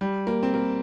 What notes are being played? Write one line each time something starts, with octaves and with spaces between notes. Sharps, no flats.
G3
A#3
C4
A#3